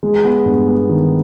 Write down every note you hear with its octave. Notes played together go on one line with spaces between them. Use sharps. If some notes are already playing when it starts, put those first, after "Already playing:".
G#3
B3
G2
B3
D#3